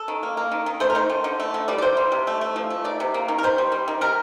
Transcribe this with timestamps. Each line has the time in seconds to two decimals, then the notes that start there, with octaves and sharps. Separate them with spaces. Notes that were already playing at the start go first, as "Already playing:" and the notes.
Already playing: A4
0.08 D#3
0.23 A#3
0.37 A#3
0.52 D#3
0.66 D#3
0.80 A3 C5
0.90 A#4
0.95 D#3 C5
1.09 D3
1.24 D3
1.40 A3
1.54 D3
1.68 G3 D5
1.78 D5
1.82 C3 C5
1.97 G3
2.12 C3
2.27 A3
2.41 A3
2.56 F3
2.70 A3
2.84 D#3 D5
3.00 C3
3.14 A#3
3.28 D#3
3.38 A#4
3.43 D#3 C5
3.58 G3
3.72 G3
3.88 D#3
4.01 G3 A#4